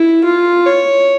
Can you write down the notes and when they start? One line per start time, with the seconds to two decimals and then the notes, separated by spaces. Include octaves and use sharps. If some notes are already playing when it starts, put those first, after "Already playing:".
Already playing: E4
0.24 F4
0.66 C#5